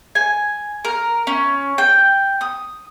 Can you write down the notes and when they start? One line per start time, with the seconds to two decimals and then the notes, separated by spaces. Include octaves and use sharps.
0.15 G#5
0.85 A#4
1.27 C#4
1.78 G5
2.41 D#6